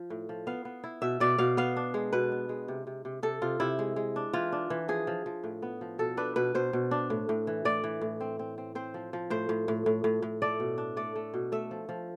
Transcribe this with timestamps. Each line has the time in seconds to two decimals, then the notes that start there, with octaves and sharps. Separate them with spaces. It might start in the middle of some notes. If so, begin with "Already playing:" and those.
Already playing: F3
0.10 A2
0.29 F3
0.47 B3 F5
0.65 B3
0.84 E4
1.02 B2 E5
1.20 B2 D5
1.38 B2 F5
1.57 B3 F5
1.76 D4
1.94 G#3
2.13 B2 B4
2.32 B3
2.49 G#3
2.68 C3
2.87 C3
3.05 C3
3.23 C3 A4
3.42 C3 F4
3.60 C3 E4
3.79 G#3
3.96 G#3
4.16 D4
4.33 E3 F4
4.52 D4
4.70 E3
4.88 F3 G#4
5.07 F3
5.26 F3
5.44 A2
5.62 B3
5.81 F3
5.99 B2 A4
6.17 D4 B4
6.36 B2 B4
6.55 B2 C5
6.73 B2
6.91 D4
7.10 A2
7.29 A2
7.47 E3
7.65 A2 D5
7.84 E3
8.01 A2
8.21 C4
8.39 C4
8.58 C4
8.75 C4 C5
8.94 F3
9.13 F3
9.30 A2 C5
9.49 A2
9.68 A2
9.86 A2
10.04 A2
10.22 A2
10.42 A3 D5
10.60 B2
10.78 D4
10.97 A3 D5
11.16 A3
11.34 B2
11.52 A3 E5
11.71 F3
11.89 F3